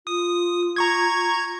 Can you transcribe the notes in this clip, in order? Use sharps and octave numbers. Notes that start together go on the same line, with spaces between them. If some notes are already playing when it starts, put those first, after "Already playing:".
F4 D#6
A#5 C#6 G#6